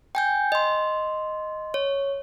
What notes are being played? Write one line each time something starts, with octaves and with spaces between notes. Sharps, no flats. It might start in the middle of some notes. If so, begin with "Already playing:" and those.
G5 G#5 G6
D#5 C6
C#5